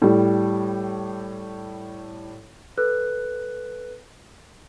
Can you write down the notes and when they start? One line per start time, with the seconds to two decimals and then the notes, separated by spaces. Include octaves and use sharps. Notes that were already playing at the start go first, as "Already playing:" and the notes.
0.02 A2 G3
2.78 A4 B4 F#6